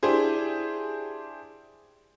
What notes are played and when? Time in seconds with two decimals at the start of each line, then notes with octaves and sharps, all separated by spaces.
0.03 D4 E4 G4 G#4 C5